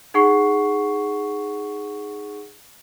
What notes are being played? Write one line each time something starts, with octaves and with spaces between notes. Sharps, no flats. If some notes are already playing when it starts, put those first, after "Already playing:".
D#4 G#4 F#5 C#6 C7